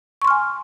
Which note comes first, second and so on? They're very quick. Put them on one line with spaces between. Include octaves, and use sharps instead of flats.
C#6 C6 F6 G#5